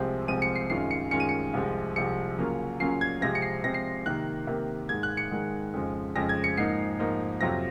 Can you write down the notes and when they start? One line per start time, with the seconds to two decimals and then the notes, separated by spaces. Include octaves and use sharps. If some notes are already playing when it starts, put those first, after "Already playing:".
Already playing: C2 C3 F3 G#3 C4
0.28 C2 C3 F3 G#3 C4 D#7
0.42 C#7
0.55 C7
0.70 F#2 D#3 G#3 C#4 F4 C7
0.91 C#7
1.11 F#2 D#3 G#3 C#4 F4 C#7
1.20 D#7
1.29 C#7
1.53 C2 C3 F3 G#3
1.96 C2 C3 F3 G#3 C#7
2.38 C#3 F#3 A#3 C#4 F4
2.80 C#3 F#3 A#3 C#4 F4 C7
3.01 G#6
3.21 C3 F3 G#3 C4 A#6
3.35 C#7
3.42 C7
3.64 C3 F3 G#3 C4 A#6
3.74 C7
4.06 C3 D#3 A#3 F#6
4.47 C3 D#3 A#3
4.89 G#2 D#3 G#3 G#6
5.03 F#6
5.17 C#7
5.31 G#2 D#3 G#3
5.74 F2 C#3 F3 G#3
6.15 F2 C#3 F3 G#3 A#6
6.29 G#6
6.44 C#7
6.57 G#2 F3 A#3 D#4 C7
6.99 G#2 F3 A#3 D#4
7.41 F2 C3 F#3 C4 F4 A#6